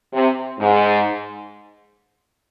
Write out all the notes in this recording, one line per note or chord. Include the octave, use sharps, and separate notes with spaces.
C3
G#2